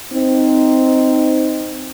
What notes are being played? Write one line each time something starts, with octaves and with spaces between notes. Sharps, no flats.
C4 D#4